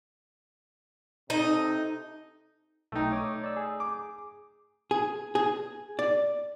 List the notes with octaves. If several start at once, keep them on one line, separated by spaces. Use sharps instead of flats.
C3 D#4 A4 D#5
B1 A3 D#4 G5
C#5 D6 D#6
D5 E6
G#4
D6
G#4
G#4
D5